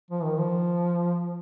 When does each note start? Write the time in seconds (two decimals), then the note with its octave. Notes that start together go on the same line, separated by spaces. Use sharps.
0.11 F3
0.23 D#3
0.38 F3